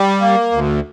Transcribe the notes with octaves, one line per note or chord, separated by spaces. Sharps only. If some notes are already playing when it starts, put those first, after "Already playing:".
Already playing: G3
A#3
D2